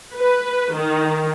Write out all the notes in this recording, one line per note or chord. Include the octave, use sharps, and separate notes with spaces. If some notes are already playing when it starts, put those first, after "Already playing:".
B4
D#3